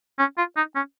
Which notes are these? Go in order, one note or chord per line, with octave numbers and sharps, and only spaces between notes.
C#4
F4
D#4
C#4